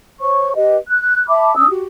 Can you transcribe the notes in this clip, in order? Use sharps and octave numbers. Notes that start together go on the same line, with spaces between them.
C5 C#5 C#6
G4 B4 D#5
F#6
E5 A5 B5 D6
C#4 D4 D#6 E6
F#4 G4